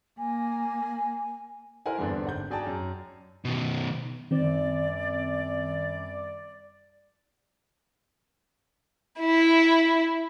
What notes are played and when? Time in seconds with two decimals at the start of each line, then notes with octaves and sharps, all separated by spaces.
0.18 A#3 G#5
1.86 E4 A#4 C5 F#5 G#5
1.98 E2 G2 D3 B3 C4 D4
2.25 G#1 F#5 G6
2.50 F#4 G#4 D5 G5 A5 A#5
2.66 F#2
3.45 B2 D#3
4.31 F#2 D#3 G3 C4 D5
9.20 E4